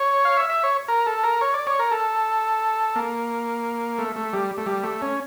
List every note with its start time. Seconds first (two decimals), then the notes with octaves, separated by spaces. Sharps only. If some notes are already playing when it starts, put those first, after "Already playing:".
Already playing: C#5
0.25 F5
0.37 E5
0.50 E5
0.63 C#5
0.88 A#4
1.07 A4
1.23 A#4
1.41 C#5
1.54 D5
1.67 C#5
1.79 A#4
1.91 A4
2.96 A#3
3.98 A3
4.16 A3
4.33 G3
4.58 A3
4.66 G3
4.83 A3
5.02 C#4